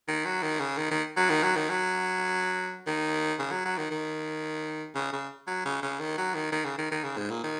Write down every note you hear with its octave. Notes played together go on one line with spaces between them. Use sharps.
D#3
F#3
D#3
C#3
D#3
D#3
F#3
D#3
F#3
D#3
F#3
D#3
C#3
F#3
F#3
D#3
D#3
C#3
C#3
F#3
C#3
C#3
D#3
F#3
D#3
D#3
C#3
D#3
D#3
C#3
G#2
A#2
D#3